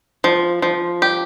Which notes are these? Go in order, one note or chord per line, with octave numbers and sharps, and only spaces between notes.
F3
F3
G4